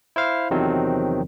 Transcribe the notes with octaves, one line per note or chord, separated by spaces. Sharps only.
E4 C5 F5
E2 C3 D#3 F3 F#3 C4